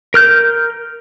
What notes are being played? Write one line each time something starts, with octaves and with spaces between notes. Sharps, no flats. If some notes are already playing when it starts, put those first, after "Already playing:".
A#4 F6 G6